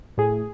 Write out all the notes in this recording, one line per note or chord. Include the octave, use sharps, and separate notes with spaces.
A2 G#4